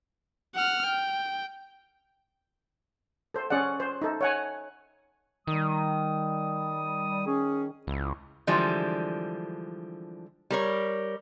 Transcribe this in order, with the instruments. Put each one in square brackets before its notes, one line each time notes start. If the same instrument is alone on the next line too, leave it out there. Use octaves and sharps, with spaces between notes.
[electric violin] F#5 F6
G5
[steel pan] A4 C5
C#4 G#4 D5 F#5
C5
D#4 A4
C#5 F#5 G#5
[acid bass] D#3 [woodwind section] G3 D#6
[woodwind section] C#4 G#4
[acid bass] C#2 [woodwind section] E4
[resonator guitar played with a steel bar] D3 E3 F3 G3 G#3
G3 A#4 C#5